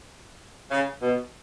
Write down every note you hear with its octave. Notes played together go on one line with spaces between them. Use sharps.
C#3
B2